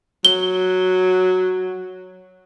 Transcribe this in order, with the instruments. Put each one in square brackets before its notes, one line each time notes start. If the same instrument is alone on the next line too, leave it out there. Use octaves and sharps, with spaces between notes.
[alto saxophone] F#3 [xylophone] G7